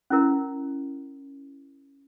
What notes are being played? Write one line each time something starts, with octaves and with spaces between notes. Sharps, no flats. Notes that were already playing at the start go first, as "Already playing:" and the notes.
C#4 E4 A#4